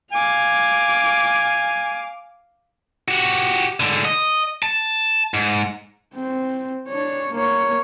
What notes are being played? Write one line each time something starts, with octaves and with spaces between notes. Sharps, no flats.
F5 G#5 D6
F#4 G4
G#2 D3
D#5
A5
G#2
C4
D4 C#5
A#3 C#5